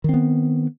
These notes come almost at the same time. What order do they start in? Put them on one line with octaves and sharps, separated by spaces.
D#3 C4 B3